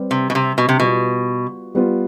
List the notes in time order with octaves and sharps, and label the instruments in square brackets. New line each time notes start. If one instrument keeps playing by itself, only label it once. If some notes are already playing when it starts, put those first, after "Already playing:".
Already playing: [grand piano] G3 C4 G4 B4
[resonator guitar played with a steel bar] C3
B2
C3
B2
C3
[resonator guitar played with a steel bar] B2 [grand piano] G3 B3 F4
[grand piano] G3 B3 F4